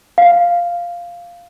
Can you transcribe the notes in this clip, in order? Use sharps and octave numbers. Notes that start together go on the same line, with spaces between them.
F5